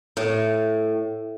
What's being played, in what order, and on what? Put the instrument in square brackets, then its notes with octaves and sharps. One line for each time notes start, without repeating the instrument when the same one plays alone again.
[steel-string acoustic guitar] A2